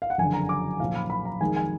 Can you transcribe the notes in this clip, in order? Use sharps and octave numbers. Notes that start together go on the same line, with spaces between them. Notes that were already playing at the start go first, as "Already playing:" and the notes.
F5
F#5
F#1 F2 D3 G#5
A#5
D6
B1 A#2 F3 F5
B5
B5
A#5
F2 D#3 G#3 D#4 G#5
G#5